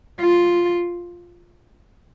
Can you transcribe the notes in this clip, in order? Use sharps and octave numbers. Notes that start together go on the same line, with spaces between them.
F4